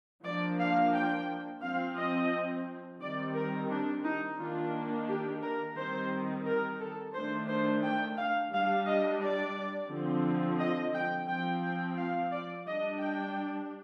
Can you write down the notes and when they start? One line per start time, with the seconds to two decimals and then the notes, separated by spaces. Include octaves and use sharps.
0.24 F3 A#3 D4 D5
0.59 F5
0.94 G5
1.62 F3 C4 F5
1.97 D#5
3.00 D#3 G3 C4 D5
3.35 A#4
3.70 D4
4.04 D#4
4.38 D#3 A#3 D4 F4
5.08 G4
5.43 A#4
5.76 D#3 G3 C4 C5
6.46 A#4
6.80 A4
7.14 D#3 A3 D4 C5
7.48 C5
7.83 G5
8.17 F5
8.52 G3 D4 F5
8.86 D#5
9.21 D5
9.90 D3 F3 C4
10.60 D#5
10.94 G5
11.28 F3 C4 G5
11.62 G5
11.97 F5
12.32 D5
12.66 G3 D4 D#5
13.00 G5